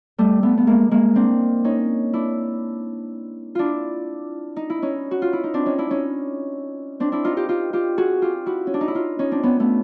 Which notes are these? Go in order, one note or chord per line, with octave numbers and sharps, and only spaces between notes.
G3 A3
A3 B3
B3
G#3 A#3
G#3 A#3
C4 D4
C#4 D#4
D4 E4
D4 E4 F4
D#4
E4
C#4 D#4
F#4
F4
E4
D#4
C4 D4
C#4 D#4
D4 E4
C#4 D#4
C4 D4
D4 E4
D#4 F4
F4 G4
F4 G4
F4 G4
F#4 G#4
F4 G4
E4 F#4
C#4
D4
D#4
E4
D#4 F4
C#4 D#4
C4 D4
B3 C#4
A3 B3